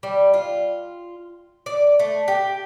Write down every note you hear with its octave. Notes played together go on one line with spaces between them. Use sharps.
G3
F4
D5
A3
G4